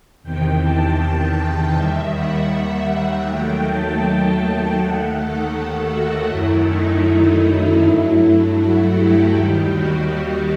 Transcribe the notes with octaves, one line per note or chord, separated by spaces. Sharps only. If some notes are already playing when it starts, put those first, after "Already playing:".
E2 C3 D#3 G5
A5
G5
D#2 D#3 G3 E5
F#5
D#2 D#3 F#3 A3 G5
A5
G5
D#2 D#3 A3 F#5
A4
F#4
F#2 D#3 F#3 A3 E4
D#4
G2 F#3 A3 E4
F#4
G4
D#2 D#3 G3
F#4